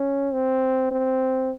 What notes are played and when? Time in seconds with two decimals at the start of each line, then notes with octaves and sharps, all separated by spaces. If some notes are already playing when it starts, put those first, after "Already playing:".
Already playing: C#4
0.33 C4
0.91 C4